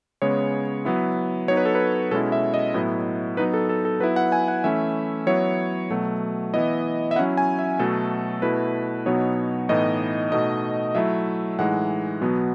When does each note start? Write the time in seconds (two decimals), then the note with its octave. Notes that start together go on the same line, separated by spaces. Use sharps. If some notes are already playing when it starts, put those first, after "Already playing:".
0.22 C#3 G#3 B3 C#5
0.85 F#3 B3 E4
1.48 F#3 B3 D#4 C#5
1.57 B4
1.65 A4
1.75 B4
2.11 B2 G#3 C#4 E4 A4
2.32 E5
2.54 D#5
2.74 A2 F#3 B3 E4
3.37 F#3 B3 D#4 B4
3.54 A4
3.69 A4
3.85 A4
4.00 F#3 B3 E4 B4
4.16 F#5
4.32 G#5
4.48 F#5
4.64 E3 A3 C#4 E4 E5
5.27 F#3 B3 E4 C#5
5.90 B2 F#3 A3
6.53 E3 B3 E4 D#5
7.11 E5
7.16 F#3 C#4 E4 F#5
7.37 G#5
7.59 E5
7.79 B2 F#3 A3 A4
8.42 B2 A3 E4 B4
9.06 B2 F#3 B3 D#4 C#5
9.69 A2 E3 B3 D#4 D#5
10.32 B2 A3 D#4 D#5
10.95 F#3 A3 E4 E5
11.58 A2 E3 G#3 D#4 F#5
12.21 B2 F#3 B3